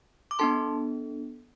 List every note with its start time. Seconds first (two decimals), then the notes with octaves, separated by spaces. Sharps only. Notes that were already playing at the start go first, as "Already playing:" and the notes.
0.31 D6
0.39 B3 D4 A4 A5 C6